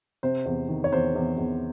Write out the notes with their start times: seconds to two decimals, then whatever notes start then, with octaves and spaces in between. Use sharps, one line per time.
0.23 C3 C5
0.46 E2
0.69 D#3
0.84 C#5
0.92 E2 C5
1.15 E2
1.38 E2